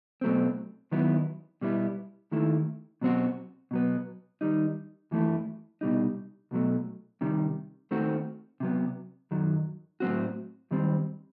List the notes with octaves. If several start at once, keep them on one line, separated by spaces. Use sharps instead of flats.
B2 F#3 A3 C4
D#2 D#3 F#3 B3 E4
B2 G3 B3 E4
D#2 D#3 A3 E4
B2 F#3 C4 F#4
B2 F#3 B3
D#3 G3 D#4
F#2 E3 A3 E4
C2 B2 G3 D#4
B1 B2 F#3 A3
C3 D#3 G3
D#2 D#3 A3 C4 F#4
C3 F#3 B3
F#2 D#3 F#3
A2 F#3 C4 F#4
F#2 D#3 G3 C4